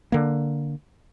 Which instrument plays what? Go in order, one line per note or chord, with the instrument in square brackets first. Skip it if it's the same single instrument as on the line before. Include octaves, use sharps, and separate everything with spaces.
[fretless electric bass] D3 A#3